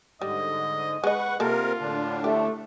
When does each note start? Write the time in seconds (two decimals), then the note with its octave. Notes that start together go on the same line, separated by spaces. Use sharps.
0.22 G#2 D3 G3 D#5
1.04 G#3 B4 D#5 F#5 C#6
1.40 C3 A#3 F4 G4 A4 A#4
1.80 A2 D3 D4
2.24 A3 G4